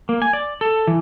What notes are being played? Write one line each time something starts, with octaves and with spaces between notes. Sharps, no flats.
A#3
G#5
D5
A4
E3